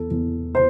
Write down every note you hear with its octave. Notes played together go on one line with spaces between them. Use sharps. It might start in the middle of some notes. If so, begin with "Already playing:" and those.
Already playing: E2 A4
E2
C5